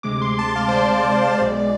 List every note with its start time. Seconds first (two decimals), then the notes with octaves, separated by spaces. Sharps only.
0.03 D2 C3 G#3 D6
0.22 C6
0.39 A5
0.56 F5
0.68 C5
0.72 D5
1.41 B1 B2 G#3